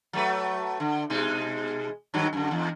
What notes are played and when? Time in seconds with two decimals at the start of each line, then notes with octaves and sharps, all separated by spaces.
0.13 F#3 A3 B4
0.80 D3
1.10 B2 G#3 D#4
2.14 G2 D#3 F#3
2.33 F#2 D3
2.51 E2